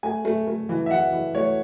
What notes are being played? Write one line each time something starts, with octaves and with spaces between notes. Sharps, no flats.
A3 G#5
A3
A3
E3
E5
E3 F#5
E3
A3 C#5